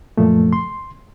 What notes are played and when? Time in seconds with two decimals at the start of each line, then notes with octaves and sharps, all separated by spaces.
0.17 F#2 A#2 F3 A3
0.53 C6